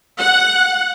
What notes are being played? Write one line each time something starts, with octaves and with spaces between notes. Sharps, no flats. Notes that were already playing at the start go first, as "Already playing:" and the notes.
F#5